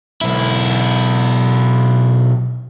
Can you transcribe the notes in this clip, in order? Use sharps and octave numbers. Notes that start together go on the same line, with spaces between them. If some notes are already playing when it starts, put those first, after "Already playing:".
B1 E4